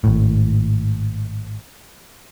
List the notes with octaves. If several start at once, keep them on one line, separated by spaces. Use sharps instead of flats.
G#1 A2